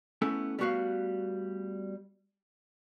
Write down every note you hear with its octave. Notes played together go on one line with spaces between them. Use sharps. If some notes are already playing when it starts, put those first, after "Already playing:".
A3 B3 C#4 E4 A4
G3 A3 B3 F#4 B4 F5